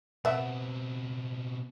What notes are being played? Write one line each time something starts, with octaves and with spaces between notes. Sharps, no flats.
B2 B3 C4 E5